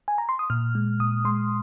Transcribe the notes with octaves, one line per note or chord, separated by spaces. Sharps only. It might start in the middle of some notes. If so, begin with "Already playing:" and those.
G#5
A#5
C6
D#6
A#2 F6
G#3
A#2 D#6
G#3 C6